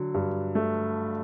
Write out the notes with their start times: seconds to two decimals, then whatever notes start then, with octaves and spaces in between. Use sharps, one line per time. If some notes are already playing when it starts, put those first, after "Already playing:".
Already playing: D3 F#3
0.14 G2
0.55 A3